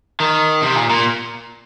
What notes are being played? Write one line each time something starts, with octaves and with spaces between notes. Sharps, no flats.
D#3
C3
A#2
A#2